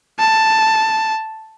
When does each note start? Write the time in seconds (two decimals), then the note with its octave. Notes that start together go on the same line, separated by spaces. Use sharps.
0.20 A5